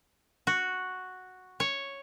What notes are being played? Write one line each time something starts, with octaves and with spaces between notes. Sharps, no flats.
F#4
C#5